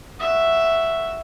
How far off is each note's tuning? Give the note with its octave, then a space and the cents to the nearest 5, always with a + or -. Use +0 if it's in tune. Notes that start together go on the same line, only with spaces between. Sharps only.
F#4 +0 E5 +0